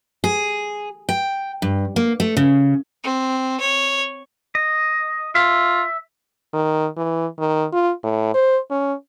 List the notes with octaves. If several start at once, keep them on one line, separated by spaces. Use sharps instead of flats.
G#4
G5
G2
A#3
A3
C#3
C4
C#5
D#5
F4 E5
D#3
E3
D#3
F4
A2
C5
C#4